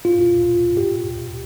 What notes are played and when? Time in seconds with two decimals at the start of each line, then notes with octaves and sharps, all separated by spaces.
0.05 F4
0.77 G4